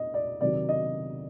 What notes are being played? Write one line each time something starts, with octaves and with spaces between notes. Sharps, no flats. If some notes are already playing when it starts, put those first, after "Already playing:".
Already playing: D#5
D5
C3 D#3 F#3 D5
D#5